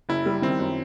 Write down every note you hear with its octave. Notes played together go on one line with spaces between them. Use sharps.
F#1 E4
G3
D#3 C4
F#2